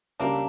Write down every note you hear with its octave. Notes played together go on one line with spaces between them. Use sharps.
C#2 C#3 G3 A#3 C#4 D4